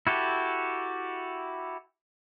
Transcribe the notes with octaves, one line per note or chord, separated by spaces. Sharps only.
E4 F#4 G4 A4